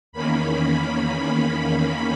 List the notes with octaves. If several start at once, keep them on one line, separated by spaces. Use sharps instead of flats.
E2 D#3 A#3 C#4 B5
B5